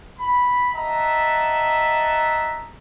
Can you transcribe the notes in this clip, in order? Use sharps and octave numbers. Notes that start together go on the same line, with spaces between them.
B5
D#5 E5 F#5 A5 A#5